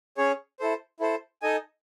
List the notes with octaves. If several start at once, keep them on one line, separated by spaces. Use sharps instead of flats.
C#4 G#4 C#5
E4 A4 C5
E4 A4 C5
D#4 A4 D#5 G#5